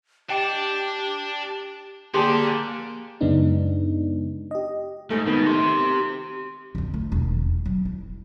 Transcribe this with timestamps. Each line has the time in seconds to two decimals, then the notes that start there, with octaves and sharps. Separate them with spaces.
0.29 D4 G4 D#5 G5 A5 D6
2.14 D3 A#3 G4 G#4 D5 A5 C6
3.21 F#2 C#3 G#3 B3 D4 D#4
4.51 G4 D#5
5.10 G#2 A3
5.27 B2 D#3
5.47 G4 C6
6.75 F2 D3
6.94 A3
7.12 E1 D#3
7.42 C#4
7.66 F#3
7.85 E4